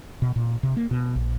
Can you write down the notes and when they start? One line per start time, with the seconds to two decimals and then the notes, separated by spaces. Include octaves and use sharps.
0.22 B2
0.36 A#2
0.63 C3
0.77 A#3
0.91 B2
1.16 A#1